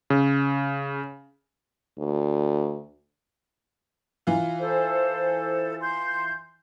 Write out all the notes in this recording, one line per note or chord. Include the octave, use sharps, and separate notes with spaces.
C#3
D2
E3 F4
A4 C5
C6 G6